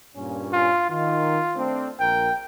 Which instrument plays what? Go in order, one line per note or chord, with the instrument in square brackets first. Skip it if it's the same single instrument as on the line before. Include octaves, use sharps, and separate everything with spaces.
[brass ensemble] G2 A#2 C#4
[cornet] F4
[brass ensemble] D#3 [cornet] F4
[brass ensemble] A3 C4 D4
[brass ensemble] A#1 A#4 [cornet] G5